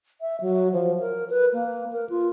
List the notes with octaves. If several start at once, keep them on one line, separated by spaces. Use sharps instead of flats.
E5
F#3
F3
A#4
B4
A#3
A#4
F4